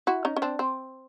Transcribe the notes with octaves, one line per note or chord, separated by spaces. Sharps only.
E4 F#4
C#4 D#4
C#4
C4 D4
C4